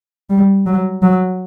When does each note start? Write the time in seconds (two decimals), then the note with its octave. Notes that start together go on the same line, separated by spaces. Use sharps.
0.30 G3
0.66 F#3
1.02 F#3